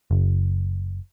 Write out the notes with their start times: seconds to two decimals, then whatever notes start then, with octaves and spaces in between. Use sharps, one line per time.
0.11 F#1